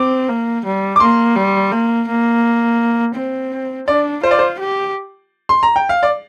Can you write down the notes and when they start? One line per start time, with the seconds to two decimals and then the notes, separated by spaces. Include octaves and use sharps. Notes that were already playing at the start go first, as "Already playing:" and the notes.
Already playing: C4 D6
0.29 A#3
0.65 G3
0.96 D6
1.00 A#3 C6
1.36 G3
1.72 A#3
2.08 A#3
3.15 C4
3.87 D4 D5
4.23 F4 C5
4.31 D5
4.39 C5
4.59 G4
5.49 C6
5.63 A#5
5.76 G5
5.89 F5
6.03 D5